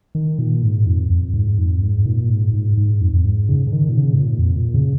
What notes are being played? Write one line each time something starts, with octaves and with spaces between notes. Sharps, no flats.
D#3
A#2
G#2
F2
F2
G#2
F2
G#2
A#2
G#2
G#2
G#2
F2
F2
G#2
C#3
C#3
D#3
A#2
C#3
G#2
A#2
F2
A#2
C#3